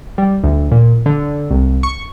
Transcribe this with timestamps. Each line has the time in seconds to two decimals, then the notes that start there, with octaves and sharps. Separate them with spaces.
0.18 G3
0.44 D2
0.71 A#2
1.06 D3
1.51 C2
1.83 C#6